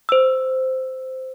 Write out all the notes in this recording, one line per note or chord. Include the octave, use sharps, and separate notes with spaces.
C5 E6